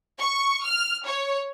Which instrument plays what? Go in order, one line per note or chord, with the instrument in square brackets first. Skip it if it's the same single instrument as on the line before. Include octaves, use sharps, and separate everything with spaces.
[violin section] C#6
F6
C#5